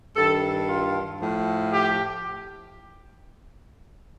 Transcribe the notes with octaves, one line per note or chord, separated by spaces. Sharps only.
G2 D#3 A4
F4
A2 F3
G4